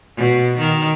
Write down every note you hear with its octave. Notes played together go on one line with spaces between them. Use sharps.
B2
D#3